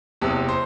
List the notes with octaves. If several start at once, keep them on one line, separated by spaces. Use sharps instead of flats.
F#1 E2 C3 G4
C5